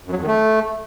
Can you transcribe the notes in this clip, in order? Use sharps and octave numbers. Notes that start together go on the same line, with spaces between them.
F#2
F#3
F2
D#3
A3